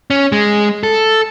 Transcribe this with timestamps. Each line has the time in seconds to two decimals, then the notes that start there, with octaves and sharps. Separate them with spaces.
0.10 C#4
0.32 G#3
0.83 A4